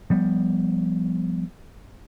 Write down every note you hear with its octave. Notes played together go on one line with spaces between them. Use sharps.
F3 G3 B3